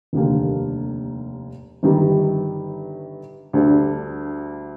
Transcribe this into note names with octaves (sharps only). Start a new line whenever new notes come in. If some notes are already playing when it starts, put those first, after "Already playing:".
F1 D#2 D3 G3 A#3
G1 G2 D#3 G3
D2 D3 G3 D4